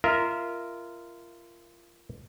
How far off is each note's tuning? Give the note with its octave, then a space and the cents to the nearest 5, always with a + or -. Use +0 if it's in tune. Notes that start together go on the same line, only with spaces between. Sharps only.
F4 -25 A#4 +0 E5 -20